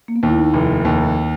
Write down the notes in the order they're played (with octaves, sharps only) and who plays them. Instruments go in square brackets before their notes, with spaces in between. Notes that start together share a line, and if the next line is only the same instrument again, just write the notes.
[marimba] A#3
B3
[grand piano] D#2
[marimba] E4
D#4
[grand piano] F1
[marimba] E4
[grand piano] D#2